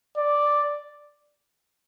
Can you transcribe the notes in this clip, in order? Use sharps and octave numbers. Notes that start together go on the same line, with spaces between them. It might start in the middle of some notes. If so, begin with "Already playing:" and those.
D5